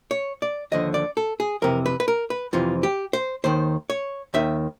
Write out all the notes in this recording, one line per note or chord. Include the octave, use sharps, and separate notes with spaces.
C#5
D5
D#2 D3 F3 D#5
D5
A4
G#4
F2 C3 E3 A#4
B4
B4
A#4
B4
F2 C3 E3 F4
G4
C5
D#2 D#3 C5
C#5
D#2 D#3 E5